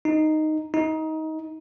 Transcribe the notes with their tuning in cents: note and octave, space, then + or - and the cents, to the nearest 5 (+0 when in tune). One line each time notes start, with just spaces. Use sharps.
D#4 -5
D#4 +20